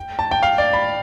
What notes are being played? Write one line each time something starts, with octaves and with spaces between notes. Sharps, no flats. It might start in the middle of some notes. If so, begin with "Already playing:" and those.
Already playing: G5
A5
G5
F5
D5
B5